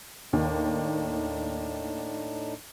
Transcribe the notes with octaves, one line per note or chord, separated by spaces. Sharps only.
D#2 A2 D4 D#4